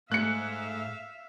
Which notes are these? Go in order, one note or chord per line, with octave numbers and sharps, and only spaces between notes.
G#2 A3 E5 F5 F#6 C#7